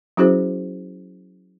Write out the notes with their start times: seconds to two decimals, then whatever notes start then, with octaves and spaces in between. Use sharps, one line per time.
0.17 F#3 C#4 E4 F#4 G#4 C5